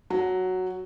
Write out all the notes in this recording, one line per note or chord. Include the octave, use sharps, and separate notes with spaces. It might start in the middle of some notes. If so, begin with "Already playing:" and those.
F#3